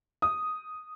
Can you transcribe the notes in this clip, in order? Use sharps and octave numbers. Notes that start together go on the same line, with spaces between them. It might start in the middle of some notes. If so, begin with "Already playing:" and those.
D#6